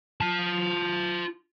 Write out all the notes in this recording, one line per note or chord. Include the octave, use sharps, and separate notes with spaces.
F4 A5